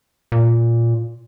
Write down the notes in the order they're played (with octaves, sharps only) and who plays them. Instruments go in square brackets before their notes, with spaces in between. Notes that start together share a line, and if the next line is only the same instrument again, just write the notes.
[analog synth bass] A#2